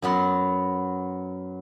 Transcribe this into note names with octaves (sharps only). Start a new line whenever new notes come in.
F#2 F#3 B3 C6